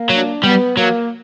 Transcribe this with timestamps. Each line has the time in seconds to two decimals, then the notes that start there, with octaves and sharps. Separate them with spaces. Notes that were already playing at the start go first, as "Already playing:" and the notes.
Already playing: A#3
0.09 F#3 D4
0.43 G3 B3
0.76 F#3 A#3